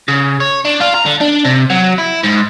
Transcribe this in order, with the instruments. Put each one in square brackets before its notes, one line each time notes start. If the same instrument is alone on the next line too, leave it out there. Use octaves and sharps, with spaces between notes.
[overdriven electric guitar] C#3
C#5
D4
F4
A#5
D3
D4
C3
F#3
E4
G#2